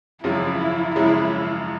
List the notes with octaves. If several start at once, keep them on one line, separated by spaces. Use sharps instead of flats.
G#1 F#2 C#3 F3 G#3 E4
G#1 F#2 C#3 F3 G#3 E4